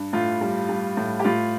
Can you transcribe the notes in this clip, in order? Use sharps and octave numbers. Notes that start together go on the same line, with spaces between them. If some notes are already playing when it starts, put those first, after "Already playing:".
Already playing: G2
A2 F4
G3
G3
A2
G4
A2 F4